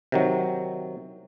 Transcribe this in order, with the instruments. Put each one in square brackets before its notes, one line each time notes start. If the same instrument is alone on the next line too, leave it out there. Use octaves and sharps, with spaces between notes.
[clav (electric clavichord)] C3 D#3 F#3